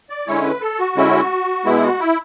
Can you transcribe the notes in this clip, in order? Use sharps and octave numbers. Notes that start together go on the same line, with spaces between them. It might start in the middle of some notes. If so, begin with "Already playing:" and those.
D5
D3 G#3 C#4 E4 C#5
B4
A4
F#4
D3 G#3 C#4 E4
B2 G#3 B3 E4
F#4
E4